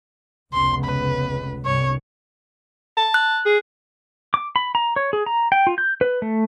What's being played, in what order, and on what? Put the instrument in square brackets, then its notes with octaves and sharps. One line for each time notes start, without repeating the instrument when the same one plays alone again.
[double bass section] F1 C#2 B3 [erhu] C6
[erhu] B4
[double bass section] C2 G2 [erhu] C#5
[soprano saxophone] A5
[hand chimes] F#6
[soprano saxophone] G#4
[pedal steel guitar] D6
B5
A#5
C#5
G#4
A#5
G5
F4
G6
B4
A3